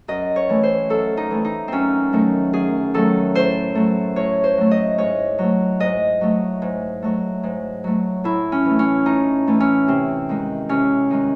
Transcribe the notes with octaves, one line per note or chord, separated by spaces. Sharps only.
F#2 D#5
C#5
E3 A3
C5
F#2 A4
D#4
E3 A3
D#4
F#2 C4 C#4
D#3 F#3 A3
F#2 G#4
D#3 F#3 A3 A4
A2 C5
F#3 A3
A2 C#5
C5
F#3 A3
D#5
G#2 C#5
F#3 A3
G#2 D#5
F#3 A3
G#2
F#3 A3
G#2
F#3 A3
A2 E4
C#4
E3 A3
C#4
A2 D#4
E3 A3
C#4
C3 C4
D#3 G#3
C3 C#4
D#3 G#3